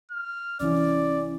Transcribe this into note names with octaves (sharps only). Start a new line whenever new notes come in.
F6
C2 E3 C#4 E4 D5